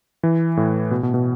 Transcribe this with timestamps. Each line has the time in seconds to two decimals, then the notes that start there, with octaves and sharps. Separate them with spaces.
0.23 E3
0.57 A2
0.91 B2
1.03 B2
1.14 B2